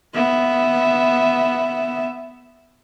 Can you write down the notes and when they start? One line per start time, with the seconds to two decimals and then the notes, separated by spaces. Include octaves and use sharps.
0.14 B3 E5